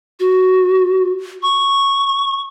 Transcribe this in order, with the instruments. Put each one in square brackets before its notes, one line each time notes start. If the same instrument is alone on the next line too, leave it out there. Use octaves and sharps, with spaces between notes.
[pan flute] F#4
C#6